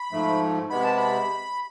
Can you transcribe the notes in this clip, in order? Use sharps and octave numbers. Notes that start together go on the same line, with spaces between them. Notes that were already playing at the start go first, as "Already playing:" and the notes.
Already playing: B5
G#2 F3 A3
C3 G#3 B3 B5
A5
B5